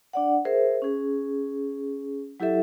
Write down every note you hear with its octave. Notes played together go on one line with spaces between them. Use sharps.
D4 D5 F#5
G#4 A#4 C5 E5
C#4 G#4
F#3 E4 G4 A4 E5